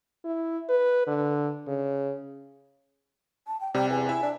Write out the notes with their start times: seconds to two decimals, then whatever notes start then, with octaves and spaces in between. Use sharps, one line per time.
0.25 E4
0.69 B4
1.07 D3
1.67 C#3
3.47 A5
3.61 G5
3.74 C3 G3 G5
3.90 E2 G#5
4.09 E4 E5
4.23 D4